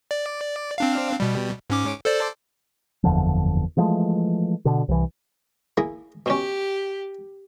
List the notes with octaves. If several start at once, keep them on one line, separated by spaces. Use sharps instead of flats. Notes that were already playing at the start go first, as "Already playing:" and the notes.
D5
C4 D4 F5
B2 G3
G#2 C#4 D6
A4 C5 D5
F#1 E2 D3 F3
E3 F3 G#3 A3
B2 D3
C2 E3
A#3 E4 G#4
B2 C#4 G4